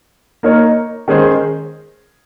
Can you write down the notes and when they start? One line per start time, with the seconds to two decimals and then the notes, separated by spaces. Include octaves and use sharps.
0.43 A#3 D#4 A#4 C#5
1.08 D#3 G#3 C#4 G#4 C5